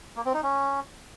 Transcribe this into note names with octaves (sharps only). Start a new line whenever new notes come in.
A#3
C4
D#4
C#4